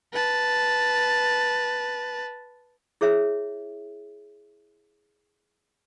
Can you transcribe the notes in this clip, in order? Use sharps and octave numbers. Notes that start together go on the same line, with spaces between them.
B4 A5
E4 G#4 C#5 E5